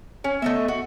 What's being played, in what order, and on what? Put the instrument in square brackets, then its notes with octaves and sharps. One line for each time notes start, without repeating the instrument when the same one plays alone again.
[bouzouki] C#4 [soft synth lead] C#5
[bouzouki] A3 D#5 E5 [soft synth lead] B3
[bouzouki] F#4